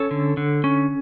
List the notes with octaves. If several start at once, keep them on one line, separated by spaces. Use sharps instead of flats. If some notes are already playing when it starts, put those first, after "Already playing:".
Already playing: C#4 A4 C#5
D3
D3
C#4